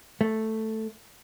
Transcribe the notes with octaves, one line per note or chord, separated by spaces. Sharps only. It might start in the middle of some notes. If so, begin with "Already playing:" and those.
A3